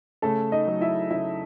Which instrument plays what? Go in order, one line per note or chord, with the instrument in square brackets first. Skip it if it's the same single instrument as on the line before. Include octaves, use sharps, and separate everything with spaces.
[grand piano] C#3 A3 A4
D#4 D#5
F#3 A3
E4 E5
C#3 E4 E5